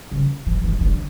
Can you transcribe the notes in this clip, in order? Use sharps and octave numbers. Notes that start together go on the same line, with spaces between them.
C#3
E3
D#3
D3